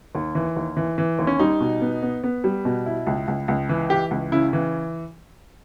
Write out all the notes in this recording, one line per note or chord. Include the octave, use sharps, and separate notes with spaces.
D#2
E3
D#2
E3
E3
D#2
C#4
G3 D#4
B2
B3
B3
B3
G3
B2
E4
C#2
C#2
C#2
E3
E3 G4
C#2
C#3 E4
E3